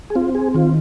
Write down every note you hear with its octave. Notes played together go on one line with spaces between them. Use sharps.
G#4
C4 F4
G#4
D#3 F4